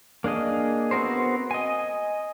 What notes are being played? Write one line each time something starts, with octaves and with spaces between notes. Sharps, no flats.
A#3 D4 G#4 D#5
B3 C4 F#4 A#4 C5
D#5 G#5